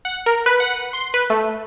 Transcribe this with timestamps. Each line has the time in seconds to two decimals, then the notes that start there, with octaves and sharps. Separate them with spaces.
0.05 F#5
0.26 A#4
0.46 B4
0.60 F#5
0.93 C6
1.14 B4
1.30 A3